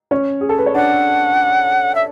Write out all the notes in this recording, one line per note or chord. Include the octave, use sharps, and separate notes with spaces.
C#4 C#5
G#4
A4
B4
C#5
D4 D5 F#5
E5